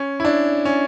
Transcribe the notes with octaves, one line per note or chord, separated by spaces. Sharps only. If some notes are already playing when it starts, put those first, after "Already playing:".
Already playing: C#4
E4
D4
C#4